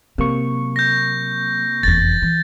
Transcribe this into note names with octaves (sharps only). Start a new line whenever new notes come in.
C3 F#3 A#3 C#6
G6 A#6
F1 E2 A6
E3